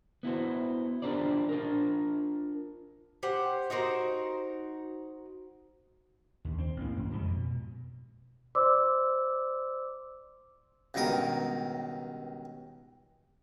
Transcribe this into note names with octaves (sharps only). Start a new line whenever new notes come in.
B3 E4 F#4 C5
D4 F4 G4 A#4 C5 D5
D4 F4 A#4
G4 C5 F#5
D#4 F#4 A#4 C5
D#2
C4
A1 A#3
F#2
F2 G#2 C3 D#3
B2
C5 D5 C6 D6 E6
C#2 G2 B2 D#3 A#4 D#6